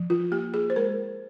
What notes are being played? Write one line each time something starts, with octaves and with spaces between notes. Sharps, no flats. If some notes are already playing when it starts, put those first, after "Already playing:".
Already playing: F3
F4
A#3 G4
G#4
C5
G#3 A#4